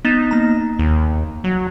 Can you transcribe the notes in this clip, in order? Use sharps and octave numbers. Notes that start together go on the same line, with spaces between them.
B3 D#4 A6 E7
A#3 A#5
D#2
F#3